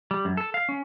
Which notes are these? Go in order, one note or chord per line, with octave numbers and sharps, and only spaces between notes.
G3
F#2
A4
F5
C#4